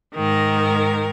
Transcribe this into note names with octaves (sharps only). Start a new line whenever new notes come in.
G#2 D#3 A#4